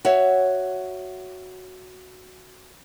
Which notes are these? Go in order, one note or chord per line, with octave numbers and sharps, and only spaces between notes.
F#4 C#5 E5